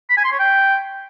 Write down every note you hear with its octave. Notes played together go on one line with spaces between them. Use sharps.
B5
G#5
C6
C#5
G5